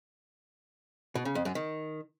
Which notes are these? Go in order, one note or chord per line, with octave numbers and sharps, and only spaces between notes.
B2
C#3
F2
F#2
D#3